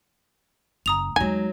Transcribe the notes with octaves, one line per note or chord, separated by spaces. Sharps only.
F#1 A#5 D#6 F7
E2 F#3 G#3 D#4 G#5